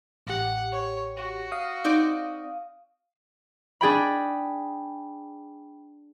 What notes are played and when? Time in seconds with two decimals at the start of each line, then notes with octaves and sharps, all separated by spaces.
0.27 A1 G4 F#5
0.72 C#5
1.17 F#4
1.52 F5 D#6
1.84 C4 D#4 D5
3.81 D4 G#4 G5 B5